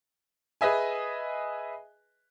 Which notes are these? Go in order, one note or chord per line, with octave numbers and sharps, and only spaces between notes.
G#4 B4 D#5 E5 G#5